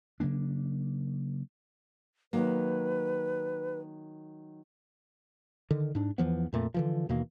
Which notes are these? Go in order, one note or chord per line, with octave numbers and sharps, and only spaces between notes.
C#3 F#3 A#3 D4
D#3 F#3 A#3 B4
D3 D#3
G#2 D4
E2 E3 F3 B3
F2 A#2 A3
D3 E3 F3
D#2 B2 E3 A#3